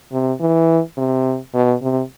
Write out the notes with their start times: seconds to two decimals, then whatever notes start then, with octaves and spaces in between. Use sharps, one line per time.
0.12 C3
0.40 E3
0.97 C3
1.54 B2
1.82 C3